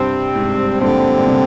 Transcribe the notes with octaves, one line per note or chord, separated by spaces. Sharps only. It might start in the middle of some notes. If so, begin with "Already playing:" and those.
Already playing: G2 C3 G3 C4
G#2
G2 A#2 D3 G3 C4
A#2
C3